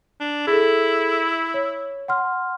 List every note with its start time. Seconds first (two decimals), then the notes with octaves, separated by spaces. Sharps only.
0.20 D4
0.47 E4 G#4 A4
1.54 C#5
2.08 F#5 C6 F6